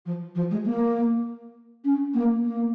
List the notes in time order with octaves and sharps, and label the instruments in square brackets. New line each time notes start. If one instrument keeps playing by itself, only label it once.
[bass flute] F3
F3
G#3
A#3
C#4
A#3
A#3